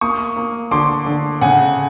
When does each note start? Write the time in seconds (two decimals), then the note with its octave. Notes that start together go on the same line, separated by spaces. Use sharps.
0.01 A#3 C#6 D#6
0.37 A#3
0.71 D3 C6 D6
1.06 D3
1.41 C#3 F#5 G#5